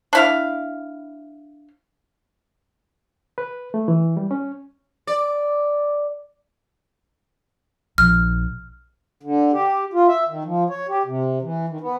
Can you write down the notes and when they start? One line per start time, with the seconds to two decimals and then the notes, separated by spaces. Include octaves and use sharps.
0.13 D4 E4 F5
3.38 B4
3.74 A3
3.88 E3
4.17 G3
4.31 C#4
5.07 D5
7.98 A#1 F3 F6
9.23 D3
9.53 G4
9.93 F4
10.08 E5
10.29 D#3
10.44 F3
10.70 C#5
10.89 G4
11.06 C3
11.42 E3
11.69 D#3
11.81 B3